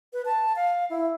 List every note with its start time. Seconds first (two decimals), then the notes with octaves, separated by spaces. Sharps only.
0.13 B4
0.25 A5
0.56 F5
0.90 E4